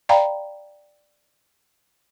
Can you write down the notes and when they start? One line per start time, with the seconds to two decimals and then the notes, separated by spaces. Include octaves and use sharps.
0.09 D5 F5 G5 A#5 B5